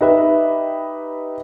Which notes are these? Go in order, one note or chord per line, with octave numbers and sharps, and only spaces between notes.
D#4 G4 B4 E5